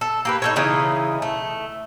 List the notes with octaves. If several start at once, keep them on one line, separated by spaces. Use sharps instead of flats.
A4
A#3 G4 B4
D#4 A4 C#5
C#3 E3 D#4
A3